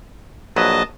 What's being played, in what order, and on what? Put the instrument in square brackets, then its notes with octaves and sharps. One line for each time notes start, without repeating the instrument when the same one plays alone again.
[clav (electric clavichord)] A#1 F#3 B4 [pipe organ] D#5 A5